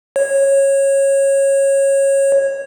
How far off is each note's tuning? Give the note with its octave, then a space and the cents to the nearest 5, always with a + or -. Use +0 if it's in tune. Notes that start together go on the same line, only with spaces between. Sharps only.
C#5 -15